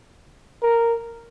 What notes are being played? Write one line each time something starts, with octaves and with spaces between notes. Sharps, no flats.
A#4